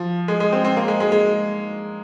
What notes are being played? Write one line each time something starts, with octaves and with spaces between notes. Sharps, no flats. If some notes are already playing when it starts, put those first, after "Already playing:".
Already playing: F3
G#3
G#3
C4
C4
A#3
G#3
G#3
G#3